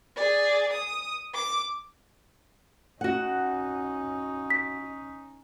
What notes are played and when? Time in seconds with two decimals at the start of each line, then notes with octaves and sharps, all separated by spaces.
0.17 G#4 D5
0.73 D#6
1.35 D6
3.01 C#4 D#4 F#4 F#5
4.50 B6